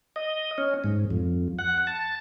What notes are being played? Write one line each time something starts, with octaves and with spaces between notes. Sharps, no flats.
D#5
C#4
G#2
F2
F#5
A5